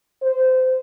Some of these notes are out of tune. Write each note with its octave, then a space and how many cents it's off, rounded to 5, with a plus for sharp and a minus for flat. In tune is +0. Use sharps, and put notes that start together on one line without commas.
C5 -20